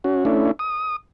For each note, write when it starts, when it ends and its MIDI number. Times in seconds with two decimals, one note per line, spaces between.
0.04 0.25 61
0.04 0.25 66
0.25 0.51 57
0.25 0.51 61
0.25 0.51 62
0.25 0.51 64
0.59 0.96 87